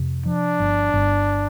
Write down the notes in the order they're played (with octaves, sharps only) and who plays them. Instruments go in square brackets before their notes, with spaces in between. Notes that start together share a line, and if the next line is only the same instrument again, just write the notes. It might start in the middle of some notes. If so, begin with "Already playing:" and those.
Already playing: [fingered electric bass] F2 C3
[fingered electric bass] F3 [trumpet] D4
[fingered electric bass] G1
G1